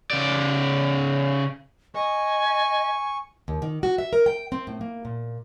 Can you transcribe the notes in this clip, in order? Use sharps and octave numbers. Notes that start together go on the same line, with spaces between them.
C#3 D5
D#5 G#5 C#6
D#2
D#3
F#4
E5
A#4
G5
C4
A2
A#3
A#2